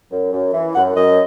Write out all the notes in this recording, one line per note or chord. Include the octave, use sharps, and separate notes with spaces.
F#2
F#2
E3
F#2 F#5
F#2 D#5